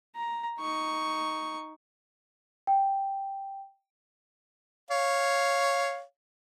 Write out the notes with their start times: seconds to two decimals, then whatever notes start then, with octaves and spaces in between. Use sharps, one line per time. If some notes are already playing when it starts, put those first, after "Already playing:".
0.15 A#5
0.59 D#4 C#6
2.67 G5
4.91 C#5 F5